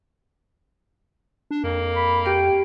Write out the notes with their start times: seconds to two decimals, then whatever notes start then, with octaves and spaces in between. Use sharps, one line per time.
1.51 D4
1.64 F2 A#3
1.96 B5
2.26 G4 G5 D7